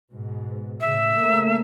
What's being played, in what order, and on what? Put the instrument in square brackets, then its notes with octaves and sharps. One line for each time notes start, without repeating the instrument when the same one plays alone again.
[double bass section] G#2 B2
[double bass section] A2 C#3 [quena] E5
[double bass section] C#3 A3 A#3